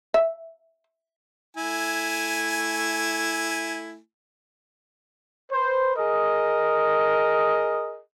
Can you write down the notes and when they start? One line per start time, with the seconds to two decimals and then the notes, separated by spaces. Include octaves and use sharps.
0.14 E5
1.57 A3 E4 G#5
5.52 B4 C5
5.97 G#4 A#4 D#5